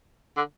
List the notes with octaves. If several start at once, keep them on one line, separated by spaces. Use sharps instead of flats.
D3